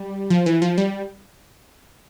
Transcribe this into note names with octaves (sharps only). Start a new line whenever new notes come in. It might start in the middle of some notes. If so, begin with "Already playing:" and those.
Already playing: G3
F3
E3
F3
G3